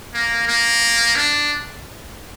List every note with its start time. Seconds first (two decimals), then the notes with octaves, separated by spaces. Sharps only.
0.14 A#3
0.48 A#3
1.16 D4